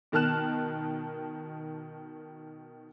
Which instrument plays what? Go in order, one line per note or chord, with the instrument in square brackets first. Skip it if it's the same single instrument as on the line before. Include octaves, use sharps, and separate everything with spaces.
[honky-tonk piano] B2 D#3 A5 F6 F#6 E7